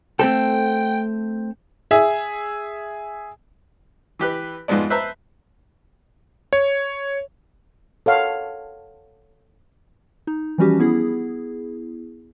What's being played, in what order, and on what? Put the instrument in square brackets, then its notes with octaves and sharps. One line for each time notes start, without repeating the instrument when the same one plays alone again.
[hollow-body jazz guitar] A3 C4 A4 [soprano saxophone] G5
[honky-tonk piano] G#4 E5
[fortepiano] E3 G4 B4
F2 G#2 F3 G#3 B3 D5
B4 C5 E5 A5 A#5
[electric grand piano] C#5
[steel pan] A4 C#5 F5 F#5
[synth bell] D#4
E3 F3 G3 C#4 F#4 G4
B3 E4 G#4